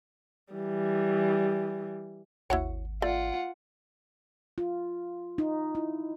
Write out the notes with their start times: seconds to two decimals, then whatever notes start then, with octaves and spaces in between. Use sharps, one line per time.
0.53 E3 G3
2.50 G#1 D#2 E4 F#4 C#5 F#5
3.02 A3 F4 D5 F#5
4.58 F4
5.38 D#4
5.75 E4